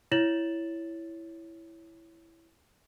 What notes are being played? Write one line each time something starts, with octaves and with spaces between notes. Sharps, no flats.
E4 C#5 A6 E7 F#7